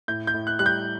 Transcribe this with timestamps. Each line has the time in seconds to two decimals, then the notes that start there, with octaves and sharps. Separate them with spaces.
0.08 A2 G6
0.27 G6
0.34 A2
0.47 F#6
0.59 G3 F#6
0.66 G6